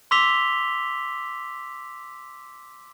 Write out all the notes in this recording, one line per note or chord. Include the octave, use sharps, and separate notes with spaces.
C6 D6 E6 B6 F7 G7